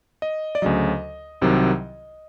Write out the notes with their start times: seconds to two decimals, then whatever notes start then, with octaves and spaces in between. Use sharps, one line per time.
0.22 D#5
0.55 D5
0.62 D2 C#3 F#3 D#5
1.41 C2 C3 D#3 F#3